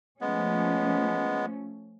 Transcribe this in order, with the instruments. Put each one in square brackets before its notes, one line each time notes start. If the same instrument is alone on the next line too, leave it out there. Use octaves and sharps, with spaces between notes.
[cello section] F3 A3 C#4 [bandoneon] G#3 B3